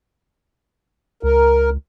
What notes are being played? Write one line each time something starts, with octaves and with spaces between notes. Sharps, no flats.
C#2 A#4